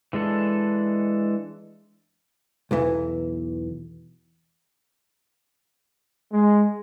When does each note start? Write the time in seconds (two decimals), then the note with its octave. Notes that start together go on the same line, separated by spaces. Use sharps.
0.13 E3 G#3 D4 A4
2.71 B1 E2 E3
6.32 G#3